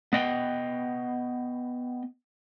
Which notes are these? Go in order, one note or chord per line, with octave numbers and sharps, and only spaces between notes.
B3 D#5 G5